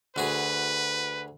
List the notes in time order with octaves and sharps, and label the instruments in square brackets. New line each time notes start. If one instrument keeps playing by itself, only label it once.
[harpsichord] D2 F#4 G#4 [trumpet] B4